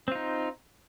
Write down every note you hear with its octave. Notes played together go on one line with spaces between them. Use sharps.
C4 D#4 F4